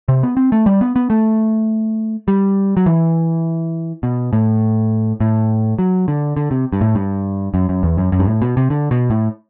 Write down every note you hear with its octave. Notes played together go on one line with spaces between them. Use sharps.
C3
B3
C4
A3
G3
B3
B3
A3
G3
F#3
E3
B2
A2
A2
F#3
D3
D3
C3
G2
A2
G2
F#2
F#2
E2
F#2
F#2
G2
A2
B2
C3
D3
B2
A2